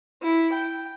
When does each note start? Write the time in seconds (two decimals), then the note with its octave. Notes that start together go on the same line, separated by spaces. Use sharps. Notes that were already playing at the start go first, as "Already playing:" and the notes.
0.22 E4
0.53 G5